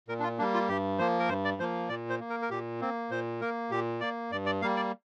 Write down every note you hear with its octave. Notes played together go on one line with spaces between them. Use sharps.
A#2 A#4
D4
F4
G3 A#3 D4
F4
G2 G4
F3 A#3 C5
A#4
G2 C5
D5
F3 A#3 C5
A#2 D5
C5
A#3
A#4
A#4
A#2 G4
A#3 C4
A#2 C5
A#3 A#4
A#2 G4
A#3 D5
G2 D5
D5
G3 A#3 F5
D5